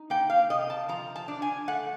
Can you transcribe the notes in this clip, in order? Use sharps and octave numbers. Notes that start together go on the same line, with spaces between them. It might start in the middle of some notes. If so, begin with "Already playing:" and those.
Already playing: D#4
A#3 G5
F5
C3 D#5
A5
F3 A#5
A5
D4
G#5
A3 F#5